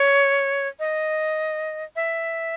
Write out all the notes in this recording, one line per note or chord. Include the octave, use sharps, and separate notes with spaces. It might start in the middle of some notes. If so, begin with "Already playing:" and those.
Already playing: C#5
D#5
E5